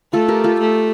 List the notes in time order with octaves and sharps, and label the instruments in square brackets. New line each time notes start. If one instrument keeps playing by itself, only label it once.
[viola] A3 [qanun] F4 A4
[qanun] G4 A#4
F4 A4
[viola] A3